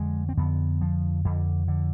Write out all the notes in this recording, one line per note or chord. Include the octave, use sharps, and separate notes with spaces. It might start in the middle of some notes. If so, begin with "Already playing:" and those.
Already playing: F2 D3 G#3
C4
F2 D3 B3
F3
F2 D3
D3